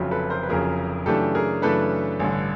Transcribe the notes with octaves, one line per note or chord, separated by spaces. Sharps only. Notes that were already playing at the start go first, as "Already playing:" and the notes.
Already playing: F1 F2 C#3 F#3
A4 B4
A#4 C5
B4
F1 F2 C#3 F#3 G#4 A#4
F#2 C#3 E3 A3 D4 G4 A4
G#4 A#4
F#2 C#3 E3 A3 D4 A4 B4
A1 G2 D3